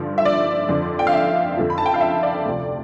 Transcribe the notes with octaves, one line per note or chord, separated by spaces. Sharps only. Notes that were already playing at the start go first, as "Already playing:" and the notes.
Already playing: G2 D3 F3 D5
E5
D5
F2 D3 F3
G5
F5
E5
F2 D3 F3
B5
A5
G5
F5
E5
D5
D2 C3 F3